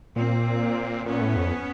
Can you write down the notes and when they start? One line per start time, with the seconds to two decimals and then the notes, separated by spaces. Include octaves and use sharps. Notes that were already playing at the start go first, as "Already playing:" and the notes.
0.16 A#2 A#3 C4
1.06 A#2 B3 C#4
1.21 A2
1.37 F2